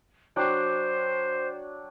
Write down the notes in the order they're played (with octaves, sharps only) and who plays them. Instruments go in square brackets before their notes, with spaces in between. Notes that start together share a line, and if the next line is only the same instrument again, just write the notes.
[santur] F#3 D4 G5 [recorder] C5